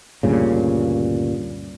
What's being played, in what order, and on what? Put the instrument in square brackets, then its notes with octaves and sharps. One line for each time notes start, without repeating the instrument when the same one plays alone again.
[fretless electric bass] D2 G2 A#2 C#3